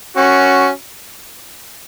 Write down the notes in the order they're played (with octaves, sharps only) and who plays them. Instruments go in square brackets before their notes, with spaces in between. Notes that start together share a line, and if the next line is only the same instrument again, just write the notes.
[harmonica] C#4 F#4